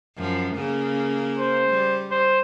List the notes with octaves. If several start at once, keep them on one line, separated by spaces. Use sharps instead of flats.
F#2 F3
C#3 A#3
C5
G3
C5